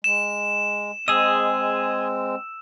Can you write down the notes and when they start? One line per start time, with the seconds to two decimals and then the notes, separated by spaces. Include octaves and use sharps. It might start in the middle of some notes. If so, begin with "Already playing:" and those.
0.04 G#3 E7
1.08 G#3 C4 G#4 D#5 E6